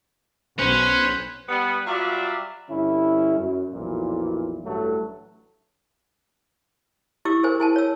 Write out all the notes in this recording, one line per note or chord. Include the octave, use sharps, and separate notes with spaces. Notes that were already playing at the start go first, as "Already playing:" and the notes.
B1 C#4 B4 C5
G3 B3
F#3 G3 F4 D5 E5
G2 D3 C#4 E4
F#2
B1 F2 A#2 E3
A1 G2 F#3 A3 A4
E4 G4 D6 E6
G#4 A#4 C5 G#5
E4 G#5 A5
C#5 E6